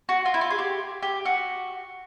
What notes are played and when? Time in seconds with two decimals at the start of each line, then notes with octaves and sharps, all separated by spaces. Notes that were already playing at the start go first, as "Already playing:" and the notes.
0.09 F#4
0.26 F4
0.34 E4
0.41 F4
0.50 G#4
0.59 G4
1.03 G4
1.25 F#4